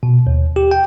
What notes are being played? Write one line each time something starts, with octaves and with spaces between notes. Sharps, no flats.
B2
D#2
G4
G5